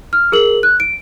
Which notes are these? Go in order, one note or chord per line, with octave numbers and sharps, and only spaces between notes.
F6
G#4 A#4 F#7
F#6
D7